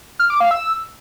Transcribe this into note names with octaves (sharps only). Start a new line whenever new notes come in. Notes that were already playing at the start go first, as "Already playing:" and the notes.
F6
D6
F5
E6